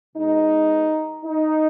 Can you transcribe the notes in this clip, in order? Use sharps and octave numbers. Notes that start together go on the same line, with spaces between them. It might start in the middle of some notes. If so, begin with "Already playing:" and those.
B2 G#3 D#4
D#4